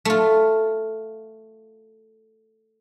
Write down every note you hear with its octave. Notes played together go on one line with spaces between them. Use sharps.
A3 F4